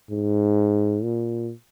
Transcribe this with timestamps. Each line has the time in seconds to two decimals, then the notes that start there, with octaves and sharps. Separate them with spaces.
0.11 G#2
1.03 A#2